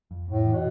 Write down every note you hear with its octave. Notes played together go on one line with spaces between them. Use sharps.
F2
F2 A2
E3
B2